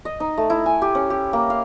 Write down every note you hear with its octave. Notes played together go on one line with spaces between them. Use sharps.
D#5
D#4
A3
E4
G#5
G4
C#4
G4
A#3
F5